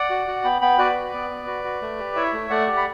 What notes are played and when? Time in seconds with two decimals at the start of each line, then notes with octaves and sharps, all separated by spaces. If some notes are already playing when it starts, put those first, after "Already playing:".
Already playing: D5 F#5
0.10 F#4
0.27 F#4
0.44 B3 G5 B5
0.61 B3 G5 B5
0.78 F#4 B4 D5
0.96 F#4
1.13 B3
1.30 B3
1.47 F#4
1.64 F#4
1.82 A3
1.99 G4
2.16 E4 C#5 E5
2.33 A3
2.50 A3 D5 F#5
2.67 G4
2.77 B5